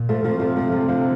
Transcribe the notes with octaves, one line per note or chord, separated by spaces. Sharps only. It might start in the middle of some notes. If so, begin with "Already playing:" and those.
Already playing: A#2
F3 A3
C3 F3 A3
F3 A3
F3 A3
F3 A3
D3 F3